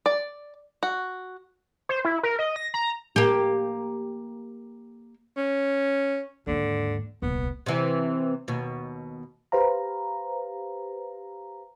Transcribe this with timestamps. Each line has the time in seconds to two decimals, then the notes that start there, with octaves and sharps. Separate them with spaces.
0.06 D5
0.83 F#4
1.89 C5
2.05 E4
2.23 A#4
2.39 D#5
2.56 A#6
2.74 A#5
3.16 A#3 G4
5.37 C#4
6.47 D#2 G#2 D3
7.22 D#1 C2 B3
7.66 C3 E3
8.48 D#2 B2
9.52 G4 B4 C5 F5 A#5